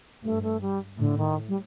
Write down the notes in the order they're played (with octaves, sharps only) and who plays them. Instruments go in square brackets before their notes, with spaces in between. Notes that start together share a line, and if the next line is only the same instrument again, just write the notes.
[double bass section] G2 [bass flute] A3
[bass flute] A3
G3
[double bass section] A2 [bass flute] D3
[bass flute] D#3
G3